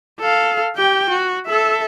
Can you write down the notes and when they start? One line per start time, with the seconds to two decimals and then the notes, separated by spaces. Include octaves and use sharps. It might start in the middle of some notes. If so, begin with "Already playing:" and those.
0.20 A4 F5
0.76 G4 G5
1.10 F#4
1.46 A4 E5